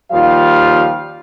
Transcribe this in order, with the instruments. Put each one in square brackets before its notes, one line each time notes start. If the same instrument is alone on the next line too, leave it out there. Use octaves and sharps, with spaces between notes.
[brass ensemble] D#2 F3 G3 F4 F5